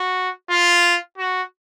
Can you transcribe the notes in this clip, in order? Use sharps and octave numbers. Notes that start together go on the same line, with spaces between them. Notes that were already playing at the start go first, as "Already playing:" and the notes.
Already playing: F#4
F4
F#4